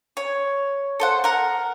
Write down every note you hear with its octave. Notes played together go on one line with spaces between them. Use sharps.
C#5
A4 C5 F#5
A#4 F#5